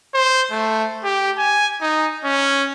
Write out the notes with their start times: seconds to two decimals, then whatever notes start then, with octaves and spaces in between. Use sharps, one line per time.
0.14 C5
0.51 A3
1.04 G4
1.38 G#5
1.81 D#4
2.25 C#4